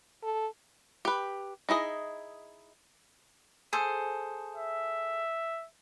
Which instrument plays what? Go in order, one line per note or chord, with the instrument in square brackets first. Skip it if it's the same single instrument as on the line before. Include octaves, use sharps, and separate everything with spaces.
[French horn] A4
[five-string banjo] G4 B4
D#4 E4 G#4 D#5
[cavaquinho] G#4 A4 C5
[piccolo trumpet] E5